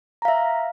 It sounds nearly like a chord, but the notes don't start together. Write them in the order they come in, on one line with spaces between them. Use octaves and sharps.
A#5 F5 E5